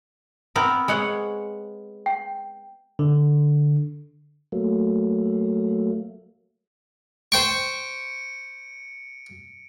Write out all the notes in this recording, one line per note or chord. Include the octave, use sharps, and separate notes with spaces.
B3 C4 A#4
G#3 C#5 F#5
G5
D3
F#3 A3 A#3
C5 G5 C#6 C#7 D7